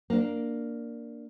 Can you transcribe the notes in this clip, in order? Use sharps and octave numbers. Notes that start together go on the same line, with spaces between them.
A#3 D4